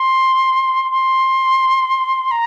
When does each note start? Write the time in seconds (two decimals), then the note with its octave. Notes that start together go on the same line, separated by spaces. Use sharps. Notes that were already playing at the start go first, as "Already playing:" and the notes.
Already playing: C6
0.91 C6
2.31 A#5